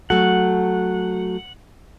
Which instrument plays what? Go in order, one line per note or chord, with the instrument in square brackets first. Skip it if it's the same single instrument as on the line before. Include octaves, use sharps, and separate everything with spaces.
[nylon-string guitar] F#3 A3 F#4 A4 [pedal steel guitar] F#5